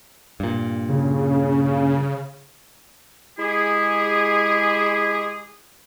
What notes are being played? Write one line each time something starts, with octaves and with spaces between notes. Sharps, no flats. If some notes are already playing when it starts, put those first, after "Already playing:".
G2 A#2
C#3
G#3 E4 G4 G#4